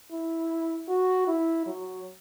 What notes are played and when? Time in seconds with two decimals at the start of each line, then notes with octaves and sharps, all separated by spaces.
0.11 E4
0.88 F#4
1.27 E4
1.66 F#3